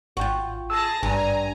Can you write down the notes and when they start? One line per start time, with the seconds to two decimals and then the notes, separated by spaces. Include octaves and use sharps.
0.17 G#1 F4 F#4 G5
0.70 G#4 A5 E6 A#6
1.03 G#1 G2 G#5 A#5